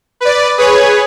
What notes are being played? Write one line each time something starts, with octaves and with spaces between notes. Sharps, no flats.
B4 D5
G#4 B4 C#5